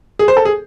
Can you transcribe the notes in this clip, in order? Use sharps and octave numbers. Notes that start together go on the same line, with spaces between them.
G#4
C5
A4
G#4